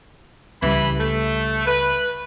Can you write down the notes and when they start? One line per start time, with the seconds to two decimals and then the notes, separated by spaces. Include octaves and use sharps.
0.62 C#2 E3 G3 B5
0.99 A3
1.66 B4